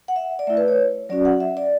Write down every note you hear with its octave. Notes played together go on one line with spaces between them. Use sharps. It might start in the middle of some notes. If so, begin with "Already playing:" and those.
F#5
E5
D5
A3 E4 E5
B4
C#5
F#3 C#4 F#4 D5
F#5
E5
D5